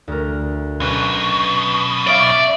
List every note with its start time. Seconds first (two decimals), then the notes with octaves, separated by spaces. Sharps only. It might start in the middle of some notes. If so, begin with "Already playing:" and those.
0.08 D2 A#4
0.80 B1 B2 C#4 B4
2.07 C#5 D5 E5 F5